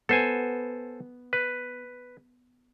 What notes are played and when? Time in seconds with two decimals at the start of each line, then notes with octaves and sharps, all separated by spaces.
0.09 B3 A4 C5 G#5
1.33 B4